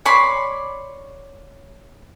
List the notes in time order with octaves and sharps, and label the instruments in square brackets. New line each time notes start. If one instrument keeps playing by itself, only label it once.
[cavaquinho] C#5 D5 B5 C6